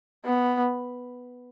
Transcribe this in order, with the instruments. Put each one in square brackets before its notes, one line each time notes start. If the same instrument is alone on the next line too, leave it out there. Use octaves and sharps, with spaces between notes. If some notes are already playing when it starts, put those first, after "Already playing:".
[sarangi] B3